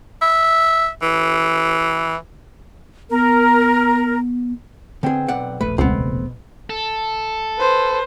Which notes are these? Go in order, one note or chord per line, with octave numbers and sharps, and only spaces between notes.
E5
E3
B3 A#4
D3 B3 C4 G#4 G5
B1 D5 F#5
E1 A#1 A3 B4
C#2 B2 B3 C4
A4
B4 C5